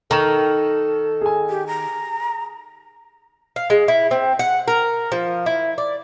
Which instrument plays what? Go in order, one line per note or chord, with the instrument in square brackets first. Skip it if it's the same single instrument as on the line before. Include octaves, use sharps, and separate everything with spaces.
[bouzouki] D#3 [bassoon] A4 [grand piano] A#5 C#6 E7
[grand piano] G#4 G#5
[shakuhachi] G4
A#5
[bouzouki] F5
G#3
E4
C4
F#5
A#4
F3
E4
D5